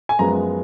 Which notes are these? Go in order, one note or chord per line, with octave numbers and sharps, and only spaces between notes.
G#5
F#2 F3 G#3 B3 A#5